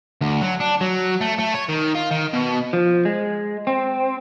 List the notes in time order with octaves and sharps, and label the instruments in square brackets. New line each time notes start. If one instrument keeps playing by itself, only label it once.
[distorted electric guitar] D2
F#3
D4
F#3
A3
A3
C#5
D#3
F4
D#3
B2
[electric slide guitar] F3
G#3
C4